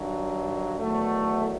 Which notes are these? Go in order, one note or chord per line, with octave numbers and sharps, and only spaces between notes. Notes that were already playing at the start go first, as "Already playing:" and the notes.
Already playing: G2 D#3 F#3
E2 D#3 F#3 A3